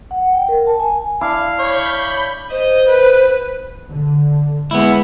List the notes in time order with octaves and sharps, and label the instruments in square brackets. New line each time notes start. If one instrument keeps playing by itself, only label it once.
[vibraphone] F#5
G5
A#4
A5
G#5
[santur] D4 E4 [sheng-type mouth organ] F5
[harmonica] C#5 [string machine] B5 G6
[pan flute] C5 [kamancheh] D#5
[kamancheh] B4
[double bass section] D3
[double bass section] G#3 [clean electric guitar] B3 E4